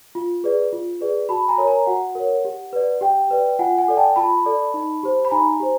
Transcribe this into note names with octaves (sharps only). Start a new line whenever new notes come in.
F4
G#4 B4 D5
F4
G#4 B4 D5
F#4 A5 B5
G#5 A#5
A#4 C#5
G#5 A#5
F#4 F#5
A#4 C#5
G4
B4 D5
G4 G5
B4 D5
F4 F#5 G#5
F#5 G#5
A4 D5
G5 A5
F4 A5 B5
A4 D5
D#4
G4 C5
B5
D#4 G#5 A#5
G4 C5